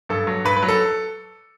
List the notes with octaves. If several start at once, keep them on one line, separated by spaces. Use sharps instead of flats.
G2 A4
F#3
G2 B4
B4
F#3
A4